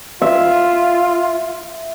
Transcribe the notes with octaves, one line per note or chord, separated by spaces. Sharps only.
F4 E5